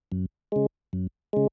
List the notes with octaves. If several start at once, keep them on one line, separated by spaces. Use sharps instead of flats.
F#2
C#3 G#3
F#2
C#3 G#3